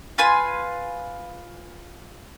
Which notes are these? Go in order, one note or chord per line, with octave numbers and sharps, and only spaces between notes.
F4 B4 G#5 C6